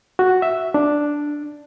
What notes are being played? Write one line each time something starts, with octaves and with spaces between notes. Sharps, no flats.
F#4
E5
D4